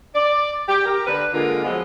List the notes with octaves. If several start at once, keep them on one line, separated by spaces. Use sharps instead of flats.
D5
G4
G4 A#4
D3 D4 B4
D3 G#3 A#3 F4 A#4
F3 F#3 G#3 B3